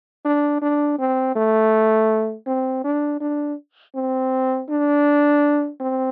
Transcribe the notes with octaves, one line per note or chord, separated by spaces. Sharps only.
D4
D4
C4
A3
C4
D4
D4
C4
D4
C4